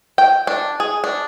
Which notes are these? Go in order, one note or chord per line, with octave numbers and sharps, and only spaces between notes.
G5
D4
G#4
D4